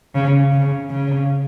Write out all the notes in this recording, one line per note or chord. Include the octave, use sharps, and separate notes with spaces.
C#3
C#3
C#3